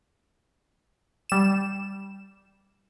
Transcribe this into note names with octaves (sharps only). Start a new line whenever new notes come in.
G3 E7